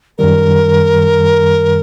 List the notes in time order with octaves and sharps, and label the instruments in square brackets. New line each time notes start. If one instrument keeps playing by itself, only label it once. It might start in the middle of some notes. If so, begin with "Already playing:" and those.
[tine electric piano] F#2 D#3 G3 [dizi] A#4